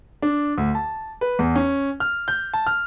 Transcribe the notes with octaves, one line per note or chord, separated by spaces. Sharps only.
D4
D2
A5
B4
E2
C#4
F6
G6
A5
F6